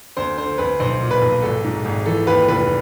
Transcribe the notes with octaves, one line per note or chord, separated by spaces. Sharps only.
D2 C5
D3 C5
D2 B4
B1 C5
A#2
B4
B1
G#1 A4
G#2
G#1
E3 A4
D#2 B4
F1 B4